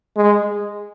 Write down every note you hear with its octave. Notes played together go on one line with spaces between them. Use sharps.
G#3